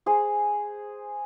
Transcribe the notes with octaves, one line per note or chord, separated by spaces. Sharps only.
G#4 C5